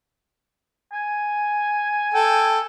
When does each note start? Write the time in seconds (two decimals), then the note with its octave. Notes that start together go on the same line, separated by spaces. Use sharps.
0.93 G#5
2.14 A4 G5